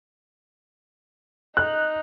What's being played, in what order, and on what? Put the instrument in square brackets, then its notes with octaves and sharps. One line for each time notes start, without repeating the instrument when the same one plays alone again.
[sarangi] D#4 [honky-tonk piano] F#6